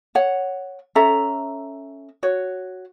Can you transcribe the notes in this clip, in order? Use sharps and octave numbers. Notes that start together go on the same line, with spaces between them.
C#5 F#5
C#4 A4 E5 A#5
F#4 C#5